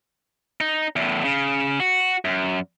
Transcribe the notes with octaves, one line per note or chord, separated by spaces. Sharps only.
D#4
E2 A2
C#3
F#4
F#2